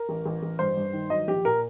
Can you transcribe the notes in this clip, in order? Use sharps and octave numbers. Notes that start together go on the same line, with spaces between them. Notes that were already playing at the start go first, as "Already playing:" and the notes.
Already playing: A#4
A1
A1
A1
G2 C5
G2
D#3
F#3 D#5
A#1 G4
A#2 A#4